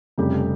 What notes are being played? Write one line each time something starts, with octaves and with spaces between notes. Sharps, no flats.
F1 F2 C#3 G3 G4